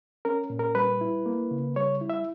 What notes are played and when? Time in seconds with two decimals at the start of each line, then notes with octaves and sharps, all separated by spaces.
0.25 C#4 A#4
0.50 A#2
0.59 A#4
0.75 G3 B4
1.01 E4
1.26 A#3
1.51 C#3
1.76 G3 C#5
2.01 E4
2.10 E5